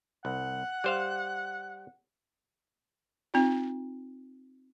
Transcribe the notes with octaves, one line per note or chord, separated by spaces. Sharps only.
C2 F#5
G3 C5 F5
C4 D#4 F4